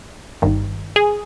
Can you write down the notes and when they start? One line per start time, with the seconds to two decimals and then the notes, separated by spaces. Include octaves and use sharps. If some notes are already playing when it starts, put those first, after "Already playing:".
0.42 G1 G2 D#3
0.96 G#4